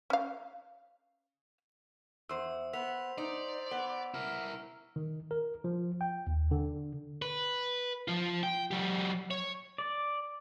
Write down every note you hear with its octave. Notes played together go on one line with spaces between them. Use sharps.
C#4 F5
E2 C5 E6
B3 C5 E6 B6 F7
D#4 D5
B3
E4 A#4 F6
D#3
A#4
F3
G5
D#2
D3
B4
F3 F4
G5
F#3 G4
C#5
D5